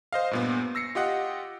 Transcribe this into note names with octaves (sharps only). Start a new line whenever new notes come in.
C5 D#5 F5
G2 A#2 B3
E6 A#6 C7 C#7
F4 G4 D#5 F#5